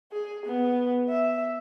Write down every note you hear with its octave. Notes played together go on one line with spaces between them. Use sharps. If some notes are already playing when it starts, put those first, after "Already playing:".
G#4
B3
E5